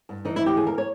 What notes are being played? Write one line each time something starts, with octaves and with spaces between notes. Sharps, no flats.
G2
E3 D#4
E3 E4
G4
D#2 G#4
A#4
C#5